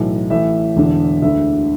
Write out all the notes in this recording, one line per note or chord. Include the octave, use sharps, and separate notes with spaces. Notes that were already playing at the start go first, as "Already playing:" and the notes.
Already playing: B1 A2 E3
A1 A2 E3 E5
E1 E2 D3
D2 D3 E5